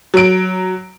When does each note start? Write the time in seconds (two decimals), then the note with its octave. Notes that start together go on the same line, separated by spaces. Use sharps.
0.14 F#3 D7